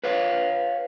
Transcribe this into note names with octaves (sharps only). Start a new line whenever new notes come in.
B4 C#5 F5